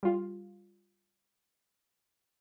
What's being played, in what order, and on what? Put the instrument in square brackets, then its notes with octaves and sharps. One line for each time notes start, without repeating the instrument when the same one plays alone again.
[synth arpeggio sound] G3 F4